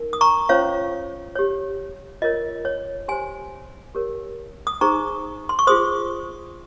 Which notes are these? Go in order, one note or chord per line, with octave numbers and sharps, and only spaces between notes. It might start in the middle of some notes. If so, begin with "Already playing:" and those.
Already playing: D#4 A#4
D#6
A#5 C#6
C#4 F4 C5 C#5 F5
G4 C#5
F4 A#4 C#5 D#5
C#5
G4 C5 G#5 C6
G4 A#4 C#5
D#6
D#4 G#4 C5 A#5 C#6
C6
C#6
F4 G#4 C5 C6 D#6